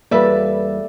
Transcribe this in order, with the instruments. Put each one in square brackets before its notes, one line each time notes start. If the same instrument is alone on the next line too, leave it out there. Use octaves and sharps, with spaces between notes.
[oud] E2 F4 B4 [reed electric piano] G3 A#3 [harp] A4 D5 E5